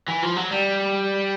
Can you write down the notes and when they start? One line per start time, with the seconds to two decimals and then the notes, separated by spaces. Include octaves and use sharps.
0.08 E3
0.22 F3
0.36 F#3
0.51 G3